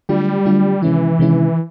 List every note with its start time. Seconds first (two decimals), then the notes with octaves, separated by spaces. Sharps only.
0.09 D3 F#3 G3 A3 D4 F4
0.46 D3 F#3 A3 D4 F4
0.82 C3 D#3 E3 G#3 C#4 E4
1.19 C3 D#3 G#3 C#4 E4